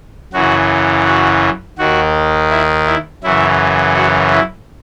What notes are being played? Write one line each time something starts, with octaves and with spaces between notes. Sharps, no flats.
F#2 C#3 E3 F#4
F#4
D#2 D#3 F#4
E4
E4
F#2 C#3 E3 E4
F#4
E4